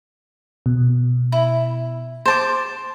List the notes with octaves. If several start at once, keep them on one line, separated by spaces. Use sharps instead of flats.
B2
E4
C5 A5 D6